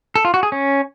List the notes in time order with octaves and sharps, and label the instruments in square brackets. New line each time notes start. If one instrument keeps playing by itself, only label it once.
[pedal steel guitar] A4
F4
F#4
G#4
C#4